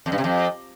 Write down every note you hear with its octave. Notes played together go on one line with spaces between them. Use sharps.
F2
G2
C3
F2